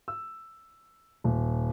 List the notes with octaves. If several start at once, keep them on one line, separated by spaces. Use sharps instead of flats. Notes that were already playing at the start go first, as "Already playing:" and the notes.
E6
D#1